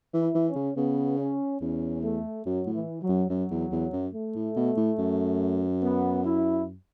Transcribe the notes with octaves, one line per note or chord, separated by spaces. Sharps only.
E3
E4
E3
C#4
C#3
C#3 B3
C#4
E2 C#4
A3
F#2 F#3
A2
E3
F#3
F#2
F#2 F#3
E2
E2
F#2
A3
A2
B2
A2
F#2
B3
E4